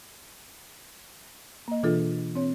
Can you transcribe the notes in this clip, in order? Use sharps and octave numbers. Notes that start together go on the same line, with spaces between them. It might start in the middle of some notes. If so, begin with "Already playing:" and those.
A#3 D#5
B2 E3 D4 F4 G#4 A4
C4 C#5